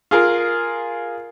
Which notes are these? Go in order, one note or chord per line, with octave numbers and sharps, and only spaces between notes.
F4 G#4 A#4